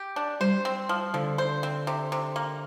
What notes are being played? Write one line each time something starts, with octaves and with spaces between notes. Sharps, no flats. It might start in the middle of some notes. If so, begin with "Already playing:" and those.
Already playing: G4
D4
G3 C5
C4
F3
D3 F3
C5
C4
C3
C3
A#3